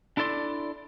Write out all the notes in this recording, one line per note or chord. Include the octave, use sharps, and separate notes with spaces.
D4 E4 A4 D5 C6